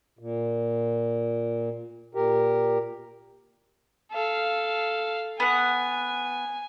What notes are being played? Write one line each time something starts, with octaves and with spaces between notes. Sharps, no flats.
A#2
A#2 G4 A#4
A4 F5
B3 F#5 G#5